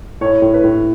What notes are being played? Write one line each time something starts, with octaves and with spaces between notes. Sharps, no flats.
A2 C#5
A2
B4
A2